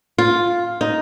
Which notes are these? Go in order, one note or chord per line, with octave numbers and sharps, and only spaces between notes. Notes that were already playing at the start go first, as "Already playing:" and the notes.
F4
D#4